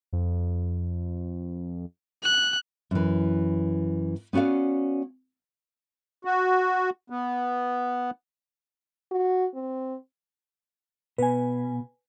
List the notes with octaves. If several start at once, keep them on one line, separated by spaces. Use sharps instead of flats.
F2
F#6
F#2 E3
B3 C#4 F#4 D5 F5
F#4
B3
F#4
C4
B2 B4 G#5